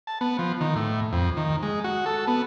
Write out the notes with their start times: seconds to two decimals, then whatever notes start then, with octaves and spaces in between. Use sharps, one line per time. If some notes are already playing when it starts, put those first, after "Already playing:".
0.07 A5
0.21 B3
0.39 F3
0.61 D#3
0.75 A2
1.12 F2
1.37 D#3
1.63 G#3
1.84 F#4
2.06 A4
2.28 B3